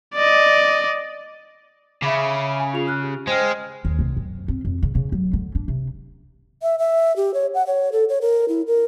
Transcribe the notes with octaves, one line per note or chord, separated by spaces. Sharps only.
D5 D#5
C#3 E5 B5 D6
G#5
F4 G#4 F7
F6 F#6
G4
G#3 C5 G5 F6
D#2
C2
F#2
C4
F2
C#3
C#3
F#3
D3
D4
C3
E5
E5
G4
C#5
F#5
C#5
A4
C#5
A#4
E4
A#4